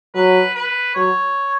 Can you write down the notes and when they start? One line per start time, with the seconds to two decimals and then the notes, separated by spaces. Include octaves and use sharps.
0.14 F#3 B4
0.55 B4
0.95 F#3 C#5